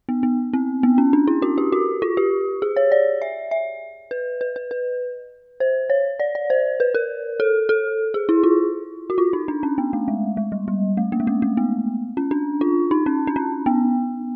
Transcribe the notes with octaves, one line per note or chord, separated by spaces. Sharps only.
B3
B3
C4
B3
C#4
D4
E4
F#4
G4
F#4
F4
G4
G#4
C#5
D5
E5
E5
B4
B4
B4
B4
C5
C#5
D5
D5
C5
B4
A#4
A4
A4
G#4
E4
F4
F#4
F4
D#4
D4
C#4
B3
A3
G#3
G#3
G3
G3
A3
A#3
G#3
A3
A3
B3
C#4
D4
F4
D#4
C#4
D4
C#4
B3